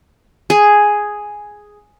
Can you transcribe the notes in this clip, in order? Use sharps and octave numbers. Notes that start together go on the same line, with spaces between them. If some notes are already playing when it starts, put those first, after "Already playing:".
G#4